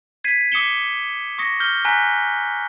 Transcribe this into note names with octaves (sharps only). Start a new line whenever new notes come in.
G#6 B6 C7 D#7
D6 D#6 C7 C#7 E7 G7
C#6 D#6 A#6 C#7
F6 G6 G7
G#5 A#5 F#6 B6